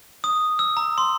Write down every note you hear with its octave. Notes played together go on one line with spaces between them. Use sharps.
D#6
E6
A#5
C6